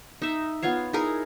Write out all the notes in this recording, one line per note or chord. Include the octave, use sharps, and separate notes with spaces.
D#4 E5
B3 F4 C#5 F5
D#4 E4 G#4 A#4